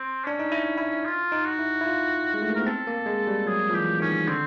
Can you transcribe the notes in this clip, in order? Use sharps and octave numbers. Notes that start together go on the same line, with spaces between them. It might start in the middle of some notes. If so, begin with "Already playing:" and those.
Already playing: C4
C#4 D4
D#4
E4
E4
F4
D#4
F#4
E4
E4
F4
G#3
A3
A#3
B3 A#4
C4 A4
A#3
G#3
G3
F#3 G#4
F3
E3 G4
D#3 C#4
D3 C4